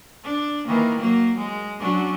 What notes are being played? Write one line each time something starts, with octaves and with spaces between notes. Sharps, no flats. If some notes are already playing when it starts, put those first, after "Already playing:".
D4
D#3 E3 A#3
F#3 A#3
G#3
F#3 C#4 D4